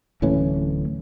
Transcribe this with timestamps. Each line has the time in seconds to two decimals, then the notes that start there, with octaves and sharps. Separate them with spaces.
0.22 D1 A2 E3 C#4